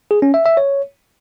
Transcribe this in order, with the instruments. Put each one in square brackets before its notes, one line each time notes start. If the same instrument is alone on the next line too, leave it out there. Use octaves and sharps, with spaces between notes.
[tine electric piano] G#4
C#4
E5
E5
C#5